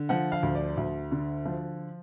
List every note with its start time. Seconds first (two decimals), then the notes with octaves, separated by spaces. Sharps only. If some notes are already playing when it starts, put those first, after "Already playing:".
Already playing: D3
0.09 F3 F#5
0.32 F5
0.43 D2
0.55 D5
0.77 D2
1.12 D3
1.46 F3